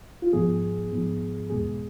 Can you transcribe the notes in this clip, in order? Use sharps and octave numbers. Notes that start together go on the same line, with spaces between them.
F4
G#2 F3 B3 G#4
G#2 F3 B3
E2 B2 G#3 B3 G#4